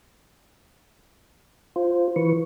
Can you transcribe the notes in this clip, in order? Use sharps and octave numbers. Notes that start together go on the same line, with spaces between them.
F4 C5
E3 B4 C#6